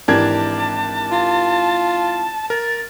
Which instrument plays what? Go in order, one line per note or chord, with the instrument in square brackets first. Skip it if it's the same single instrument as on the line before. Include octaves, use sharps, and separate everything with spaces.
[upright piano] G#1 E3 G#6 [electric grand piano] D4 G4 A#4 [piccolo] A5
[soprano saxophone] F4
[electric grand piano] A#4 [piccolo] A6